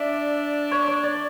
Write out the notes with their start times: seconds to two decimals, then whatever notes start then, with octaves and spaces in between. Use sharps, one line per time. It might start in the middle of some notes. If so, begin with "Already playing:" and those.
Already playing: D4 D5 E5
0.71 C#5
0.88 C#5
1.03 D5